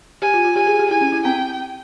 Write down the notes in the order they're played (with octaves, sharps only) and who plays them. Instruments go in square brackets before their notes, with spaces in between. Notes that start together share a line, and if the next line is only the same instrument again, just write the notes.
[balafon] G4 [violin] G#5
[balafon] F4
F4
[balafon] G4 [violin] G#5
[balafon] G#4
G4
[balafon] E4 [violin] G#5
[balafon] C#4
E4
[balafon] C4 [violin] G5